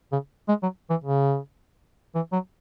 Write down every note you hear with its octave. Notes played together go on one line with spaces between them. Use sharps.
C#3
G#3
F#3
E3
C#3
E3
F#3